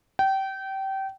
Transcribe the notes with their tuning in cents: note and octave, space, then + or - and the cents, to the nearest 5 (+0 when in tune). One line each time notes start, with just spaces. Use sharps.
G5 -25